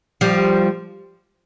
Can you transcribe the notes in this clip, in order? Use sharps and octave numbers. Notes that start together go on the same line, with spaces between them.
F3 G3